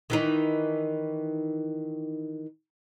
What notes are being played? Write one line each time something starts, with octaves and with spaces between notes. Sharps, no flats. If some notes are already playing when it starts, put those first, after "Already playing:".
D#3 E3 D#4